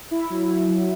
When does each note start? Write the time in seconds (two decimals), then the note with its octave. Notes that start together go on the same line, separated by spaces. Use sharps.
0.11 E4
0.30 F#3
0.49 F#3
0.68 F#3